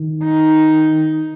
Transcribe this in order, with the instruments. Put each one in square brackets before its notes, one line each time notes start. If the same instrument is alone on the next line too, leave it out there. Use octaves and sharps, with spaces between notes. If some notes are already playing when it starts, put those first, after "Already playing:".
Already playing: [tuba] D#3
[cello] D#4